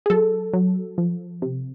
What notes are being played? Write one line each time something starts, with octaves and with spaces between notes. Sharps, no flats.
G#4
F#3 A4
F#3
F3
C3